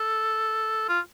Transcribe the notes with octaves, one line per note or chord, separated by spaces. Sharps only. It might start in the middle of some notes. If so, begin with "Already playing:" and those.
Already playing: A4
F4